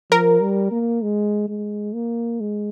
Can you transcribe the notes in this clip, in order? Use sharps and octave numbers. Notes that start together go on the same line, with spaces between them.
F3 A#4
G3
A#3
G#3
G#3
A#3
G#3